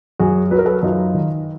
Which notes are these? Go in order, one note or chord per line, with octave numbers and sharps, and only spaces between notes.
F#2 F#4 G#4
F#3 B4
A#4
A4 B4
F#2 D#4 F4
D#3